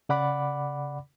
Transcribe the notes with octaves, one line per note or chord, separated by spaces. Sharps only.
C#3 D5 F#5 B5 D6